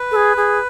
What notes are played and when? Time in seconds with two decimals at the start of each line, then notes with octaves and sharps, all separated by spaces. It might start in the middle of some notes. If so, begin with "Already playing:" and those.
Already playing: B4
0.11 A4
0.16 G#4
0.37 G#4